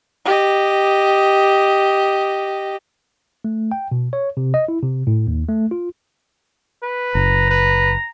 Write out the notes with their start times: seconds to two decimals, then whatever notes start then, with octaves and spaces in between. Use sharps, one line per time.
0.25 G4 D#5
3.45 A3
3.72 G5
3.92 B2
4.13 C#5
4.37 C3
4.54 D#5
4.68 E4
4.82 C3
5.07 A2
5.27 D#2
5.48 A3
5.71 F4
6.83 B4
7.15 F#1 A#5
7.50 B4